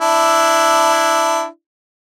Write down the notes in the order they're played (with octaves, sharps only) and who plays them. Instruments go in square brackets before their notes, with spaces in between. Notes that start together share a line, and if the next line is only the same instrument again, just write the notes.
[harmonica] D4 E4